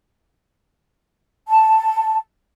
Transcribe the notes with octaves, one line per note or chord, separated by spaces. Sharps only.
A5